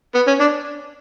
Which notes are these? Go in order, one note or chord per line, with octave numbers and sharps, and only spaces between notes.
B3
C#4
D4